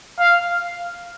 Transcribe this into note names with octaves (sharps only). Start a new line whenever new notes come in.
F5